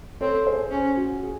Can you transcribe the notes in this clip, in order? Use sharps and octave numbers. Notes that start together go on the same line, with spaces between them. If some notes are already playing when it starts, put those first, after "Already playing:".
C4 A4 C#5
G#4 C5
C#4 G#4
F#4
G#4